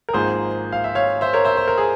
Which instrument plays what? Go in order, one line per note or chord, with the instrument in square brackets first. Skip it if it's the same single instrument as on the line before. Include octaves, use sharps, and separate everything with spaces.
[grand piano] A#4
G#1 G#2 F3 A#3 G#4 C5
F5
E5
C#5 F5
C5 E5
A#4 C#5
C5 E5
C5
A#4
G#4